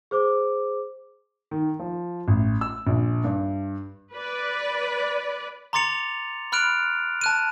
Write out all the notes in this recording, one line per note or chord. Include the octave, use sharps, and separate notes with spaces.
G#4 C5 D6
D#3
F3
A1
E6
A#1
G2
B4 D5
A#5 C6 D6 A6 C#7 F7
B5 F6 F#6 D7 F7
A5 F#6 D#7